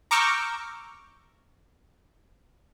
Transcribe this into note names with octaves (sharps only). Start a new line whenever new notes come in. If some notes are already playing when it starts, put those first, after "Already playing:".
A#5 C#6 D6 E6 F6 G6